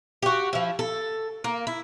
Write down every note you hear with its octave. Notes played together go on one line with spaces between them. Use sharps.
F#4 G4
F3 E4
A4
A#3
E4